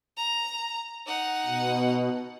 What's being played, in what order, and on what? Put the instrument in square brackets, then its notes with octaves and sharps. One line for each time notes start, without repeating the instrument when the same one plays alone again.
[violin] A#5
D#4 F#5
[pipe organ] B2